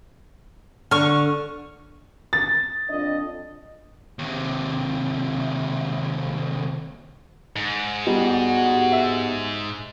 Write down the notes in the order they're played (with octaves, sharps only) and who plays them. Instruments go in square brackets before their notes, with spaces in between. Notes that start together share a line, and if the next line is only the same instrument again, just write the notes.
[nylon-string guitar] D3 [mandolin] C#6 F6
[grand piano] A6
[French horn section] F2 D4 D#5
[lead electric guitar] D#2 C3
[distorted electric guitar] G#2
[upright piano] G3 [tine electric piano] B3 G4 D#5 [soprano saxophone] F#4
[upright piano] E5